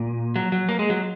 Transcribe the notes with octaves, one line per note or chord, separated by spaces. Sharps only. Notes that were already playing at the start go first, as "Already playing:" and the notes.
Already playing: A#2
F#3
F#3
A#3
G#3
F#3